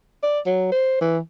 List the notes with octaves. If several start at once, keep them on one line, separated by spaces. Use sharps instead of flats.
D5
F#3
C5
E3